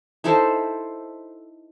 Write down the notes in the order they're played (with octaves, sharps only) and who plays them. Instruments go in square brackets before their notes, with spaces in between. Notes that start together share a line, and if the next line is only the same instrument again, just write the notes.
[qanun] D#4 E4 A4 C5